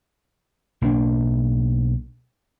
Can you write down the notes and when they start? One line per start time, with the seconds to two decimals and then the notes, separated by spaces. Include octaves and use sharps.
0.82 B1 A#3 D4